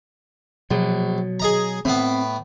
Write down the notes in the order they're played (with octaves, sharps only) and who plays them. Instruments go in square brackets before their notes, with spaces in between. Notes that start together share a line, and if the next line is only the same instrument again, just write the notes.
[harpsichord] A#1 [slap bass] B2 F#3
[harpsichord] G#4 D#5 A#5
[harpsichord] A2 B3 [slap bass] C4